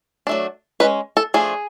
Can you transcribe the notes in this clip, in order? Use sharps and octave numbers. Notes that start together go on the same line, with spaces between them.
F#3 A3 D4
G#3 C#4 B4
A4
F3 A3 D4 G#4